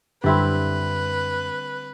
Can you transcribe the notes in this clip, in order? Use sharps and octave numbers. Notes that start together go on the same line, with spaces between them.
F#2 D3 G3 C4 E4 G4 B4